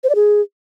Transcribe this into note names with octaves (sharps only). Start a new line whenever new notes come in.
C5
D5
G#4